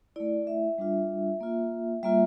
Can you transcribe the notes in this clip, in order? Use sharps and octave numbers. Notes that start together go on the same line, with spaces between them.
A3 E4 D5
E5
G3 D4 F4
A#3 F4
G3 A#3 F4 E5